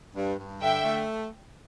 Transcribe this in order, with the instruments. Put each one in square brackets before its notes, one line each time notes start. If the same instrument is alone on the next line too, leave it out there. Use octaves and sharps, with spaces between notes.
[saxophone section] G2
G2
[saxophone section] D3 [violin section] E5 G5
[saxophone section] A3